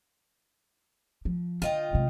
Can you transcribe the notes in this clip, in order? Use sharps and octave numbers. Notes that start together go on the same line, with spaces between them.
F3
D3 F4 D#5 G5
C3 G#3